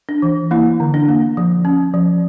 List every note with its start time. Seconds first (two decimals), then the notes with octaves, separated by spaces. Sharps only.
0.09 D4
0.22 E3
0.51 A#3 E4
0.80 D3
0.94 D4
1.08 A#3
1.37 F3
1.65 C#4
1.94 F3